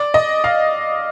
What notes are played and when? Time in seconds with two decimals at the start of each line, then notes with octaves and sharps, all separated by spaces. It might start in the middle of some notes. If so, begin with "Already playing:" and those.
Already playing: D5
0.14 D#5
0.44 F5